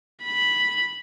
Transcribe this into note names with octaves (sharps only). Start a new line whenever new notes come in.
B5